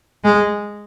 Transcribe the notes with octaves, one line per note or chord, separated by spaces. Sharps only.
G#3